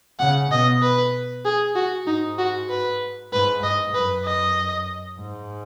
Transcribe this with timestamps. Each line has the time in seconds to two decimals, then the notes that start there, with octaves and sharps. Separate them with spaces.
0.19 C#3 F#5
0.51 B2 D#5
0.82 B4
1.45 G#4
1.75 F#4
2.07 G#2 D#4
2.38 F#4
2.70 B4
3.32 G#2 B4
3.63 G#2 D#5
3.94 F#2 B4
4.25 D#5
5.19 G#2